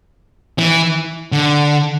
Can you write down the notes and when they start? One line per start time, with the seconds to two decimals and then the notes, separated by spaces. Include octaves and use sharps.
0.58 E3
1.32 D3